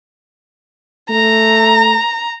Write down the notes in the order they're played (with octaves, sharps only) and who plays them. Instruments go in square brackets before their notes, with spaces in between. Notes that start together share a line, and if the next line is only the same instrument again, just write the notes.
[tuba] A3 [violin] A#5